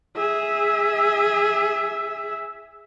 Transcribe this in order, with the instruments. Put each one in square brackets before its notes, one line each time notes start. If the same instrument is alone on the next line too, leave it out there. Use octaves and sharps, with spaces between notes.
[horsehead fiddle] G#4 E5